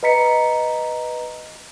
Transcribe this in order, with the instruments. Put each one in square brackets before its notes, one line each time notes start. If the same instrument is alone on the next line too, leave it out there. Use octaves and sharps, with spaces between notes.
[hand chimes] B4 D#5 A#5 B6 C#7